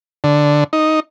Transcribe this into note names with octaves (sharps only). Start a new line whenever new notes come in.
D3
D#4